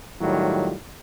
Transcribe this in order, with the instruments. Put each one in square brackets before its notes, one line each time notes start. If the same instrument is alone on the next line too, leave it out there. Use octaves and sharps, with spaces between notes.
[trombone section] A2 D#3 F#3 G3 F4